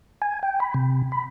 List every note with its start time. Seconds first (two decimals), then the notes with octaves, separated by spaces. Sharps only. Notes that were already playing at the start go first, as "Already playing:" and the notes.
0.22 G#5
0.43 G5
0.60 B5
0.74 C3
1.12 B5